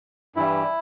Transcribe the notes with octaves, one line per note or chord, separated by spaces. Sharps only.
G2 E3 G3 E4